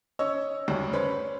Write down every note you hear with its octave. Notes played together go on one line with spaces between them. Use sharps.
C#4 C#5 D#5 E6
E1 D2 G2 C#3
C#4 B4 C5 B5